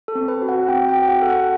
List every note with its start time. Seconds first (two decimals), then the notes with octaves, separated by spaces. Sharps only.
0.08 A4
0.15 C4
0.28 B4
0.42 F#4
0.49 F#5
0.68 C4 G5
0.89 G5
0.95 F#4
1.08 F#5
1.22 A4
1.29 F#5